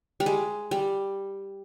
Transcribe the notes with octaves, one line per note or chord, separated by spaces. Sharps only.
G3
G#3
G3